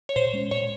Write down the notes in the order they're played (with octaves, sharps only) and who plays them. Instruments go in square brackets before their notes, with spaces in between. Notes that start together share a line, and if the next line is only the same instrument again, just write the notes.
[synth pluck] C#5
[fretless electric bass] A#2 [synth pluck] C5
[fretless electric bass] G#3 C#4
[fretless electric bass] A#2 [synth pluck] C#5